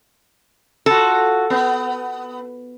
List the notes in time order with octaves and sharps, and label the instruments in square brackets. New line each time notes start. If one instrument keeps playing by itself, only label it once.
[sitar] F4 F#4 [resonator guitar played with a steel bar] A4
[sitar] B3